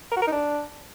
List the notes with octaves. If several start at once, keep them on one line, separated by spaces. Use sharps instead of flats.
A#4
F#4
A#4
D#4
D4